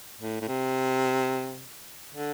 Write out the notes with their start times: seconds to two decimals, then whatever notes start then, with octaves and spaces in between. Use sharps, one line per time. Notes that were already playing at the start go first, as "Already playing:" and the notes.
0.21 A2
0.41 A2
0.48 C3
2.15 D3